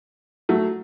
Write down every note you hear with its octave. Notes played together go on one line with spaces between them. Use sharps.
F#3 A3